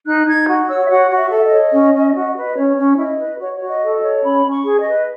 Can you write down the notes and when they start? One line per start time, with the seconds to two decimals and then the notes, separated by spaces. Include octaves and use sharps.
0.06 D#4 F#6
0.26 D#4 G#6
0.48 F#4
0.68 C#5 E6
0.85 E5
0.89 F#4 F#5
1.10 F#4
1.17 E5
1.31 A4
1.37 E5
1.45 D#5
1.52 C#5
1.72 C#4
1.94 C#4
2.14 F#4
2.35 B4
2.44 D#5
2.56 C#4 C#5
2.76 C#4
2.98 E4 D#5
3.19 B4
3.39 F#4 C#5
3.57 F#4 C#5
3.68 D#5
3.81 A4
3.96 D#5
4.02 C#5
4.23 C#4 B5
4.44 C#4
4.51 C#6
4.65 G#4
4.79 D#5
4.86 B4